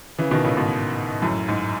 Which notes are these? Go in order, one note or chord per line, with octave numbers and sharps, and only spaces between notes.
C#3 E3
B2 D#3
A2 C#3
G#2 B2
F#2 A2
G#2